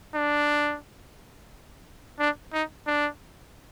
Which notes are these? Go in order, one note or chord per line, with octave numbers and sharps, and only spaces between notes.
D4
D4
D#4
D4